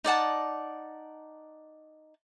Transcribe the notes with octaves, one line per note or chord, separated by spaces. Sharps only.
D#4 D5 F#5 A5